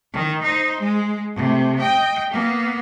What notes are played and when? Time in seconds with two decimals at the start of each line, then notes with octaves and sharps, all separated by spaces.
0.13 D#3
0.42 D#4 C5
0.80 G#3
1.34 C3 A3
1.78 D#5 G5
2.30 A#3 B3